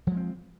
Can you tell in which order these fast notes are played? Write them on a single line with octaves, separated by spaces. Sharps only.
F3 G#3 C4